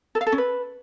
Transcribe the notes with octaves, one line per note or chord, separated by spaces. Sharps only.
A4
F5
A4
C#4
B4